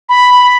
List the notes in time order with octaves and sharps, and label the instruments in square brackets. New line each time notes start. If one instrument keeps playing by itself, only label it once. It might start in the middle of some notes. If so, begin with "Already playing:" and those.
[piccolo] B5